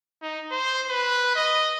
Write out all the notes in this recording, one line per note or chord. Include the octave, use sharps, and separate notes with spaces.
D#4
C5
B4
D#5